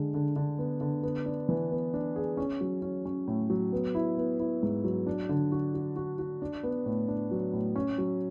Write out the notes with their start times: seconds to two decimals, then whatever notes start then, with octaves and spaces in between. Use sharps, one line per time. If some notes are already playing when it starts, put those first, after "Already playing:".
Already playing: D3 G#3
0.14 D3
0.36 D3
0.59 B3
0.81 D3
1.03 B3
1.26 D4
1.49 E3
1.71 B3
1.94 D4
2.16 G#4
2.37 C#4
2.61 F#3
2.82 C#4
3.06 C#4
3.27 A2
3.50 F#3
3.73 B3
3.95 E4
4.18 B3
4.40 E4
4.63 G#2
4.84 F#3
5.07 D4
5.29 D3
5.52 F#4
5.74 F#4
5.96 F#4
6.19 F#4
6.42 D4
6.63 B3
6.86 A2
7.08 D4
7.31 F#3
7.53 A2
7.76 C#4
7.98 F#3